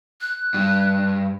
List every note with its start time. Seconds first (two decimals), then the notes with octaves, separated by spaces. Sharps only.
0.21 F#6
0.54 G2